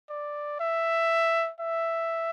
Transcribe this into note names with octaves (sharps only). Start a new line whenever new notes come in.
D5
E5
E5